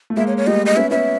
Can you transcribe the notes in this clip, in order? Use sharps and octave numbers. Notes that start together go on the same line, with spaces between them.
A3
G#3 A#3 E5
C#5
C#5
G3 A3 D#5
D#5
B3 C#4 E5
B3 C#4 E5